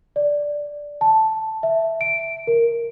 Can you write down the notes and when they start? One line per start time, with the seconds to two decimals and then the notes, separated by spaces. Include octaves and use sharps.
0.16 D5
1.01 A5
1.63 E5
2.01 D7
2.47 A#4